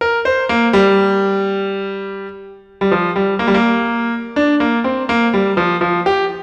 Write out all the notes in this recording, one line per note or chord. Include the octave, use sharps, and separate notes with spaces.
A#4
C5
A#3
G3
G3
F3
G3
A#3
G3
A#3
D4
A#3
C4
A#3
G3
F3
F3
G4